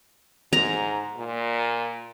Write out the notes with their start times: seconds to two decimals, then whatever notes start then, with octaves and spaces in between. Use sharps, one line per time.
0.53 G#2 A#5
1.17 A#2